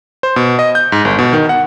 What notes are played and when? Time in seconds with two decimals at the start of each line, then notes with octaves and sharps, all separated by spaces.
0.23 C5
0.36 B2
0.59 D#5
0.75 G6
0.92 G#2
1.05 G1
1.19 B2
1.33 D#3
1.49 F#5